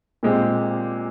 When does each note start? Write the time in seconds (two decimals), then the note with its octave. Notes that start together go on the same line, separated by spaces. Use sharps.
0.23 A#2 G#3 C4 G4